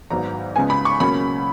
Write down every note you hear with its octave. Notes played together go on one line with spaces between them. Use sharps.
G#1 G#2 F#3 B3 A#5
C#2 C#3 G#3 B3 G#5
B5
C#6
C#2 B2 F#3 A#3 C#4 B5